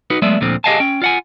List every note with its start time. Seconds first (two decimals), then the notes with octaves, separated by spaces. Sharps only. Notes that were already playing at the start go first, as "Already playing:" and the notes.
0.10 D#4 F#4 B4
0.22 F#3 G#3 A3 B3 D5 E5
0.41 D2 A#2 D3 F3 C4
0.64 G4 G#4 D#5 F5 G#5 A5
0.80 C#4 G5
1.02 F4 F#5 G#5